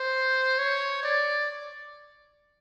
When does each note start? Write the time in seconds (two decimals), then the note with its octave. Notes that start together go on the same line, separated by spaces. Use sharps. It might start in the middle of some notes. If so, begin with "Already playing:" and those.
Already playing: C5
0.58 C#5
1.03 D5